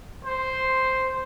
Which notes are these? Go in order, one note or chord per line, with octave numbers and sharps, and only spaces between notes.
C5